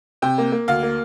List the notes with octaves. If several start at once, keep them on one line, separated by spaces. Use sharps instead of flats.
C3 G5
A#3
A#3
D2 F5
A#3